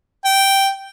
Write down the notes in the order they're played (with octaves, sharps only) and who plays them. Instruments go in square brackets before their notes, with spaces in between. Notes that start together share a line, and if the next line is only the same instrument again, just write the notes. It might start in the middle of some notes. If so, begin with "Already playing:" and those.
[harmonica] G5